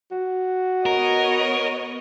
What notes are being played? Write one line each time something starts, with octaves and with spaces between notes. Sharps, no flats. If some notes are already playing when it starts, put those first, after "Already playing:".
F#4
B3 A#4 C#5 D#5